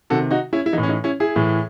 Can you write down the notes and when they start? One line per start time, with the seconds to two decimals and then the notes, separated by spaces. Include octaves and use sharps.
0.10 C3 D#3 F#4 A4
0.31 D#4 F#4
0.53 C#4 E4
0.66 E4
0.73 A2 E3 D#4
0.83 C#4
0.89 D#4
1.04 C#4 E4
1.20 E4 G#4
1.36 A2 E3